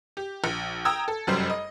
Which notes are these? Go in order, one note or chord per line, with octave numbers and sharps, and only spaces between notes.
G4
A#1
G5 A#5 D#6 E6 G#6
A4
F1 F#2 G3 C5
D#5